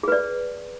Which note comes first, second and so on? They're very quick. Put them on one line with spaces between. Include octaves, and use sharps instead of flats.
G#4 B4 D5